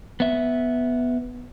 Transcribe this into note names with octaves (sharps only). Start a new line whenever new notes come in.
B3 E5